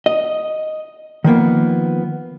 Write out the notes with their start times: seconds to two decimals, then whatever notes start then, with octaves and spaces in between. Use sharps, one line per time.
0.06 D#5
1.24 D#3 F3 A#3 B3